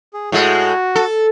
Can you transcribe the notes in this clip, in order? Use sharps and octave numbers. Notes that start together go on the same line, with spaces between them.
G#4
A2 G#3 F#4
A4